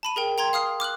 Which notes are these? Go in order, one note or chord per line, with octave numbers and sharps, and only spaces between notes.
A5 B5 D#7
G#4 A#4 G5
G5 A#5 C6 G#6
F5 D#6 F6 C7
D6 F6 F#6 F#7